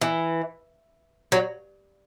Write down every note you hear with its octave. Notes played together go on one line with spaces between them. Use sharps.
E3
F#3